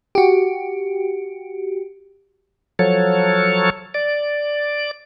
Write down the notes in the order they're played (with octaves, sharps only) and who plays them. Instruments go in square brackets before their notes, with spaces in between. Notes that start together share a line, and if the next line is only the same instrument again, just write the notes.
[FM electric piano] F#4 G4
[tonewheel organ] F3 F#3 A4 C#5
D5